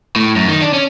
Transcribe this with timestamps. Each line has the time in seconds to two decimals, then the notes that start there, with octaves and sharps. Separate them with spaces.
0.16 A2
0.36 F#2
0.48 D#3
0.61 D4
0.73 C#4